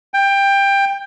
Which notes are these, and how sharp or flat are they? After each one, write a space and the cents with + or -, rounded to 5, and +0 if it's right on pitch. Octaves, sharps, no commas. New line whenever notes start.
G5 +15